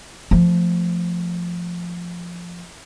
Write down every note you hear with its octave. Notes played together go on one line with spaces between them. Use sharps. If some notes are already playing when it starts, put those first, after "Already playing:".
F3 A3